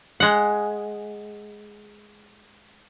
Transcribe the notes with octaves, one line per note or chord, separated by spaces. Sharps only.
G#3 F#5